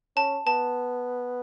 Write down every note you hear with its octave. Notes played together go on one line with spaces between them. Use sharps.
C#4 A5
B3 A5